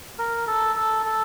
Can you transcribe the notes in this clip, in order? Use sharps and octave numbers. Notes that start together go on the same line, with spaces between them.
A#4
A4
A4
A4